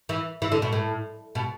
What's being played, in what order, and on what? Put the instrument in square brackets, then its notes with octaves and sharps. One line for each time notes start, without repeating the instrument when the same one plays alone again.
[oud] E3
E3
D3
B2
A2
B2